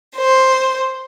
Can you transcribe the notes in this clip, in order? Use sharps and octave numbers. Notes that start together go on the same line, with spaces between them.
C5